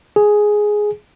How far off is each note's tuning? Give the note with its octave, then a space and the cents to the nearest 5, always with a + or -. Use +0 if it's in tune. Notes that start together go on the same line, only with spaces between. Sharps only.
G#4 +5